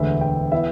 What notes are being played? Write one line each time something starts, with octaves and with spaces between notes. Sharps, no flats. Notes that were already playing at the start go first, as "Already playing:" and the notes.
Already playing: E1 D2 D3 B3 E5
G5
E3 B3 E4 E5